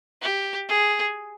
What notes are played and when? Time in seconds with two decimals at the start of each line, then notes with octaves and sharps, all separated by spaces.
0.22 G4
0.69 G#4